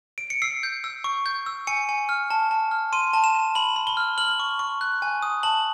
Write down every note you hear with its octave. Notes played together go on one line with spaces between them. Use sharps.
D7
C#7
E6 C7
G6
E6
C#6
G6
E6
G#5 C#7
G#5
F6
A5
A5
F6
C6 D#7
A5
E7
A5
B5 F#7
B5
G7
F6
F6 F#7
C#6
C#6
F#6
G#5
D#6
A5 F#7